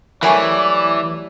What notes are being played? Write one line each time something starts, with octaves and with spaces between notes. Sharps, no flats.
E3 F#3 G3 A3 A#4 D5 G#5 C#6